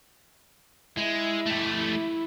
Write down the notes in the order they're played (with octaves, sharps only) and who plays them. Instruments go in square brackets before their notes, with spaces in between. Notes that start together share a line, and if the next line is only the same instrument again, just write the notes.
[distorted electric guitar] G#3 [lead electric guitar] E4
[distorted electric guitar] A3 G4